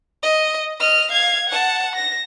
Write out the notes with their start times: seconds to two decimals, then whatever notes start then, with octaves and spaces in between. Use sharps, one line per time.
0.23 D#5
0.80 D#5 F6
1.11 F5 G#6
1.49 F#5 A5
1.96 A#6